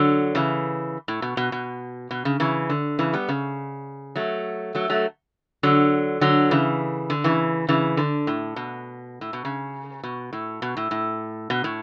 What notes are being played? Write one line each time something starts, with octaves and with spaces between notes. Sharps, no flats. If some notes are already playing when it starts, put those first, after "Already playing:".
Already playing: D3 F#3
C#3 E3
A2
B2
B2
B2
B2
C#3
C#3 E3
D3
C#3 E3
G3 B3
C#3
F#3 A3
F#3 A3
F#3 A3
D3 F#3
D3 F#3
C#3 E3
D3
C#3 E3
C#3 E3
D3
A2
B2
A2
B2
C#3
B2
A2
B2
A2
A2
B2
A2